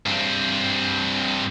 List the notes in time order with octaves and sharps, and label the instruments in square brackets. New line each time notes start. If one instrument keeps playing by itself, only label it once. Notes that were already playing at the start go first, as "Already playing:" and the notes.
[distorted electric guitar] G2 C4